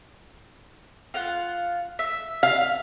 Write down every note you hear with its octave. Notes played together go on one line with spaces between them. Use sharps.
F4 F5 F#5
E5
F5